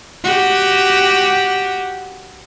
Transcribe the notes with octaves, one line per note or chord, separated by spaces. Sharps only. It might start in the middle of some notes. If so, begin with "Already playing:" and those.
F#4 G4